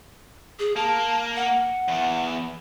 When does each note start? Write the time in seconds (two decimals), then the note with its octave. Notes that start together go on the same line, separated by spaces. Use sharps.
0.59 G#4
0.76 A#3 A5
1.36 F#5
1.88 E2